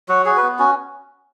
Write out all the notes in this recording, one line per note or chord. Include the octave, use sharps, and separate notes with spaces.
F#3 F#4
F#4 G#4
B4
B3
C#4 F#4